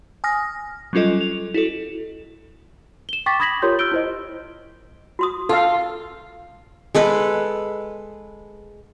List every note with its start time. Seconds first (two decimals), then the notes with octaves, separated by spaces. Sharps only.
0.24 G#5 D#6 F6 A#6
0.93 F#3 G3 C#4 F4 A4 D#5
1.21 F7
1.54 E4 F#4 A4
3.09 E7 G7
3.26 G5 C#6 D6 A6 B6
3.40 B5 D#6 G#6 A#6 B6 F#7
3.62 F4 G4 A#4 C#5 C6 G6
3.79 E6 F6 G6 D7 G7
3.92 E4 C5 D#5
5.19 F#4 C6 D#6
5.49 F4 A4 F5
6.95 G#3 A4 B4